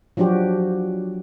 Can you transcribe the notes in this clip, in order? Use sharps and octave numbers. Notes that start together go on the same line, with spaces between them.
F3 F#3 D4 F#4 G4